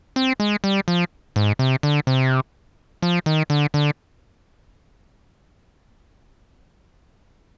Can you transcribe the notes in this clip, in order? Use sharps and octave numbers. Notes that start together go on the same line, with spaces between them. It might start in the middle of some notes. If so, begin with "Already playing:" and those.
C4
G#3
G3
F3
G#2
C3
D3
C3
F3
D#3
D3
D3